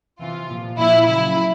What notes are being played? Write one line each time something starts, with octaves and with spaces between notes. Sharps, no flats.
C3 E3 F4
A#2 F3
A#2 F3 E4
C#3 F#3 E4